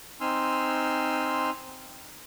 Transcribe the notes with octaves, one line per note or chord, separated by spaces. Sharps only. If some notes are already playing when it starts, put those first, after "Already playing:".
C4 D#4 G#5 C6 E6 F6